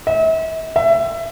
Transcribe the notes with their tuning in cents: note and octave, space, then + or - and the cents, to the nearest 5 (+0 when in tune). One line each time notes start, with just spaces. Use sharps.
E5 -40
E5 +20